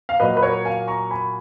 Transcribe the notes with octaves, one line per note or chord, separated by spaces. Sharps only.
F5
A#2 F#3 A#3 B4 D#5
B4
A#4 C#5
F5 G#5
A#5 C#6
G#5 B5